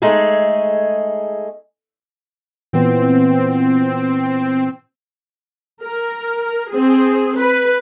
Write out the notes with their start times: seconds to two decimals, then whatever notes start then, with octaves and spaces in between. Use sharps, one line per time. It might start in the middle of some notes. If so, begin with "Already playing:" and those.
0.02 G#3 A3 D#4 G#4
2.73 A#2 E3 B3 C4
5.83 A#4
6.70 C4 G#4
7.37 B4